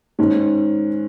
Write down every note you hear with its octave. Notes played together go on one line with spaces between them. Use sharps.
G#2 D#3 G#3 C#4